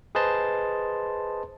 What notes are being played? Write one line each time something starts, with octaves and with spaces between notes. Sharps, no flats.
G#4 B4 C5 D#5 A5 C6